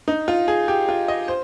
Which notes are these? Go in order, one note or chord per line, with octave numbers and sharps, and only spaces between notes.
D#4
F4
G#4
G4
F4
D#5
C5